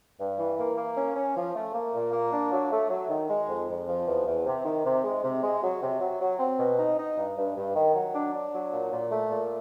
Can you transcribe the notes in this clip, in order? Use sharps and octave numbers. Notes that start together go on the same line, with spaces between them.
G2
E3
A#3
A#3
C#4
C#4
F3
A3
A#3
A#2
A#3
D4
F#3
A3
F#3
D#3
G#3
F2
F2
F3
E2
E2
C3
D#3
C3
G#3
C3
G#3
F#3
C3
F#3
F#3
C4
B2
D#4
D#4
G2
G2
G2
D#3
F#3
D4
D4
F#3
A#2
A#2
A3
A#2